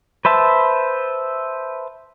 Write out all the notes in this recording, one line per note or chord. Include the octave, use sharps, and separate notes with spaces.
B4 C5 E5 A5